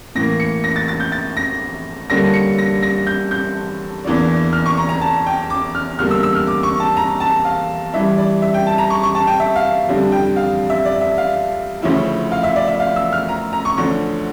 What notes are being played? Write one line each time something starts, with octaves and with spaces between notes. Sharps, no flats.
A2 E3 A#3 A#6
C#7
A#6
A6
A6
G6
A6
A#6
G2 D3 G3 A#3 C#4 A#6
C#7
A#6
A#6
G6
G6
E2 E3 A#3 D4
F6
C#6
A#5
A#5
A5
G5
D6
F6
E2 D3 G3 A#3 F6
E6
E6
F6
D6
C#6
A5
A#5
A5
F5
G2 E3 G3 E5
D5
E5
G5
A5
A#5
C#6
C#6
A5
G5
E5
F5
F2 D3 G3 D4
G5
F5
E5
D5
E5
F5
D2 C#3 F3 C#4 E4
F5
E5
D5
E5
F5
E6
F6
A#5
A#5
C#6
D2 D3 F3 C#4